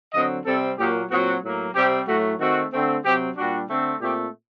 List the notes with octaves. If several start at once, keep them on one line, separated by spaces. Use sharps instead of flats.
D3 F#3 C4 D#5
C3 G3 C4 A4
A#2 F#3 A#3 G4
A#2 F#3 C4 F#4
A2 F#3 A#3
C3 G3 C4 G4
A2 F#3 A3 F#4
D#3 A3 C4 F#4
D3 A3 C4
C3 F#3 C4 G4
A#2 G3 D4 F#4
D3 A3 C4
A#2 A3 C4 G4